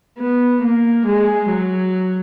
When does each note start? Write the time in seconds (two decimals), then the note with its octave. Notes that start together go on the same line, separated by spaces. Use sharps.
0.19 B3
0.62 A#3
1.06 G#3
1.49 F#3